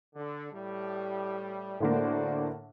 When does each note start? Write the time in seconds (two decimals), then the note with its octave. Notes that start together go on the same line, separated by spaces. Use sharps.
0.15 D3
0.52 A2 G3
1.80 A2 D3 A#3 F#4 C5 D5